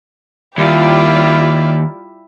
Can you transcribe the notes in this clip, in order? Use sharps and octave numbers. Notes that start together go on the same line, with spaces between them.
D#2 G3 E4 F4 G4 D5